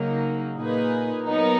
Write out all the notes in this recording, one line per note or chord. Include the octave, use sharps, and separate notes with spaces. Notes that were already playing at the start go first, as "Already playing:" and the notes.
Already playing: C#3 F#3 A#3 D#4
A#2 A#3 D#4 G#4 B4
F#3 B3 D#4 A#4